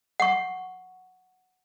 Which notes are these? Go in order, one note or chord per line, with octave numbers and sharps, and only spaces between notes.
F#5 C#6